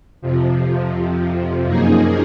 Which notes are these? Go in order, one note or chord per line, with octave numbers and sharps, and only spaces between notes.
F2 C3 F3
F#2 F3 A#3 D#4 G#4